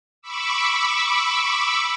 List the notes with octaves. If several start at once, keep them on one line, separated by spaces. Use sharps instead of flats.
B5 C#6 D6 E6